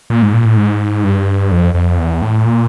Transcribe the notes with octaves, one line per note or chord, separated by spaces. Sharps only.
A#2
G#2
A#2
A2
G#2
G2
F2
F2
E2
A2
A#2